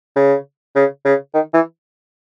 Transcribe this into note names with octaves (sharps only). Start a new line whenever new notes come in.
C#3
C#3
C#3
D#3
E3